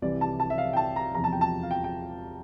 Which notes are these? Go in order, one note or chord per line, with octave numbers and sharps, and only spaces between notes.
C2 C3 E3 D5
A5
A5
E5
F5
G5
A5
A#5
E2 C3 F3 A#5
A5
G5
A5
F5
G5
G5